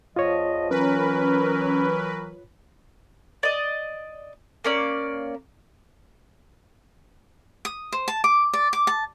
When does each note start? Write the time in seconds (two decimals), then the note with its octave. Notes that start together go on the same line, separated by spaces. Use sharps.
0.16 E2 F3 F4 C#5 D#5
0.71 E3 F#3 C#4 A#4 B4
3.43 D5 D#5
4.64 A#3 C#4 D5
7.65 D#6
7.92 C5
8.08 A5
8.24 D6
8.53 D5
8.73 D6
8.87 A5